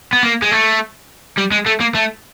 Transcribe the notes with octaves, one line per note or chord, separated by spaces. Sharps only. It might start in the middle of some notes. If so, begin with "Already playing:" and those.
B3
A#3
G#3
A3
G3
G#3
A3
A#3
A3